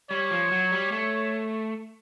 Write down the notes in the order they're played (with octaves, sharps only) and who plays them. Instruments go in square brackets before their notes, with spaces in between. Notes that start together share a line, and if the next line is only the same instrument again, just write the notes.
[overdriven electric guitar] G3 [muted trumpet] C#5
[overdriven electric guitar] F3
F#3
G3
[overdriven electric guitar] A3 [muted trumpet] C#5